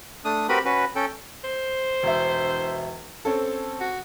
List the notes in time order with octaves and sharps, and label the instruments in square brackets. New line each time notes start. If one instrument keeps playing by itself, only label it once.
[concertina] A3 D4 D#6
C4 F#4 G4 A#4 B4 B5
C#4 F#4 B4
C#4 A4 G5
[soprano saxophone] C5
[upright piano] E1 E5
C4 C#4 A4
[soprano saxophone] F#4